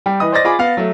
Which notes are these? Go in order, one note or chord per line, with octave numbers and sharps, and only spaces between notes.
G3 G5
E3 B4 D#5 D#6
C5 D5 D#5 A6 A#6
F4 G#4 B5 D6
B3 F5
F#3 A3